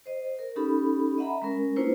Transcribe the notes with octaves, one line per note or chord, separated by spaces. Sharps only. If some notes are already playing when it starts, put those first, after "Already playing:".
C5 D#5
A#4
C#4 D#4 G4 A4 B5
D#5 E5 F#5 A#5 B5
G#3 C#4 A#4
A#3 D4 E4 F4 B4 C5